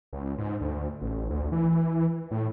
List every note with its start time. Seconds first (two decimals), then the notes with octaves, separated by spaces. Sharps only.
0.13 C#2
0.38 G#2
0.61 D2
1.02 A1
1.30 D2
1.52 E3
2.31 A2